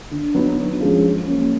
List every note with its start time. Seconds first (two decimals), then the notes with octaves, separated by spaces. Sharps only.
0.11 D3
0.35 F#3 B3 D#4
0.58 D3
0.80 F3 G#3 C#4
1.03 F#3
1.26 A#3 C#4